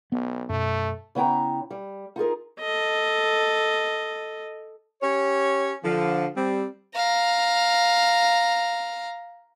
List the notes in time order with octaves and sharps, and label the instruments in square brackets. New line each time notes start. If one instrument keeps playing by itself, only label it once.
[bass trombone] B1 [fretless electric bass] B3
[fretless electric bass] F#2 B2 [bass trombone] A3
[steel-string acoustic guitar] C#3 B3 E4 G5 A#5
G3
D#4 F4 G#4 A#4
[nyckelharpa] A4 D#5
[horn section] C#4 G4 C#5
D3 F3
G3 C4
[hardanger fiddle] F5 A#5